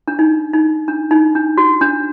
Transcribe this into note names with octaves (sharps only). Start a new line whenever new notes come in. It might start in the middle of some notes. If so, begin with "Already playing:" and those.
D4
D#4
D#4
D4
D#4
D4
F#4
D4